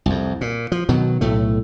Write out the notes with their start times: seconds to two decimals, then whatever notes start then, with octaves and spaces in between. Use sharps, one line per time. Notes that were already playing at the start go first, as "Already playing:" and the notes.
0.06 C2 F2
0.41 A#2
0.72 F3
0.89 B2 D#3 F#3
1.21 B1 A2 A3